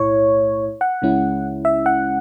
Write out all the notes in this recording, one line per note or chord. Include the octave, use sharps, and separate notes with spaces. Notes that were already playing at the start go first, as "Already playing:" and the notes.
Already playing: B1 A2 E4 C#5
F#5
C#2 C#3 G#3 C#4 E4
E5
F#5